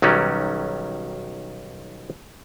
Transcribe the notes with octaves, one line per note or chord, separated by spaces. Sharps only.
B1 D#3 F#3 G3 C#4